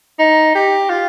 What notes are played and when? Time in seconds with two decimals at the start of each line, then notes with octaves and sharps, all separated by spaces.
0.19 D#4
0.55 G4
0.89 F4